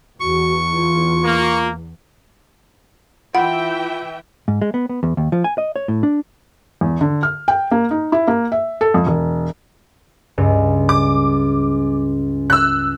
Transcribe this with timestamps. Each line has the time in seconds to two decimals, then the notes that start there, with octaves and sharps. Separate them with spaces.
0.20 E2 F#4 C#6
0.72 F4
1.24 A#3
3.35 E3 F4 E5 F#5 G5 B5
4.48 G#2
4.62 G#3
4.74 B3
4.89 B3
5.03 E2
5.17 D#2
5.32 F3
5.44 G#5
5.58 D#5
5.76 C#5
5.88 A2
6.03 D4
6.81 E2
7.01 D3
7.23 F6
7.48 G5
7.71 A#3
7.91 D#4
8.12 E4
8.28 A#3
8.52 E5
8.81 A4
8.94 F2
9.06 E1
10.38 C#2 G2
10.89 D6
12.50 E6 F#6